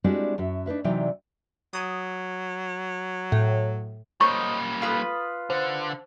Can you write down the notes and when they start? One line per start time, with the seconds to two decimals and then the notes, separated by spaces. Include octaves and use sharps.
0.04 G3 G#3 C4 D4 E4 F#4
0.38 F#2 F#4 E5
0.66 D4 D#4 B4 E5
0.84 C3 E3 F#3 D#4 D5 G5
1.73 F#3 D#6
3.32 A2
4.21 G3 A#3 C5 C#5 D#5 C#6
4.82 F4 B4 D#6
5.50 D3 C5